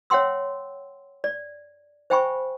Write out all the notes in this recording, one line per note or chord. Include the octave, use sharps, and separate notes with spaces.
C#5 E5 F#5 G5 C6 E6
D5
C5 E5 G5 G#5 B5 C#6